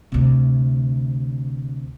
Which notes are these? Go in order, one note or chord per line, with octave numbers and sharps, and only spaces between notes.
D2 C3